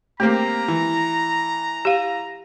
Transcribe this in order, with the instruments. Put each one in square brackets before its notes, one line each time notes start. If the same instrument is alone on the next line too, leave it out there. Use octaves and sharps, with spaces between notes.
[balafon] A3 [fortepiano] A#3 C4 G4 [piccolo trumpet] A#5
[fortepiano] E3
[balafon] G4 F5